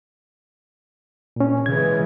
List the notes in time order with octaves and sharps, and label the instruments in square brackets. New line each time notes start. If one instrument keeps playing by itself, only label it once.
[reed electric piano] A#2 C#4
[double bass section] C#3 E3 G#3 [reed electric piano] G#6